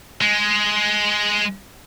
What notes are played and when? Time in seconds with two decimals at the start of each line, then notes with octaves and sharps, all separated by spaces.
0.21 G#3